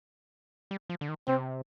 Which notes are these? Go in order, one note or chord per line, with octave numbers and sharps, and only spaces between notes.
G3
F3
D3
D#3
C3 C4